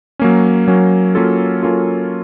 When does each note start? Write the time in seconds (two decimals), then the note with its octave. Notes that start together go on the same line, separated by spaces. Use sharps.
0.19 F#3 A#3 C#4
0.68 F#3 A#3 C#4
1.15 F#3 A#3 C#4 F4 A4
1.63 F#3 A#3 C#4 F4 A4